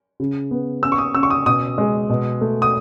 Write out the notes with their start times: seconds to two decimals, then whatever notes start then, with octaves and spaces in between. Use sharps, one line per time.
0.20 C#3
0.51 B3
0.83 C#4 E6
0.92 C#6
0.98 D#6
1.14 C#4 E6
1.23 C#6
1.30 D#6
1.46 B2 D#6
1.78 G#3
2.09 B2
2.41 A3
2.62 D#6